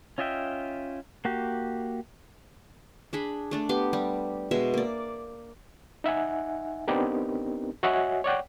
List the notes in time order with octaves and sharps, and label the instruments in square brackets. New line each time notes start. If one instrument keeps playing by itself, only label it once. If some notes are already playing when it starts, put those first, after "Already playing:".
[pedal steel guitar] C#4 F4 D#5 E5 G5
A#3 F#4 G4
[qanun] D4 G#4 B5
A3 D4 D5
B3 G4 C6 D6
G3 G4
B2 G#3 E5
A#3 D5
[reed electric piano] D#4 E5 F#5 G#5
B3 C4 D4 D#4 G4 A#4
F#4 C#5 D#5 E5 F#5 G#5
C#5 D5 F#5 G5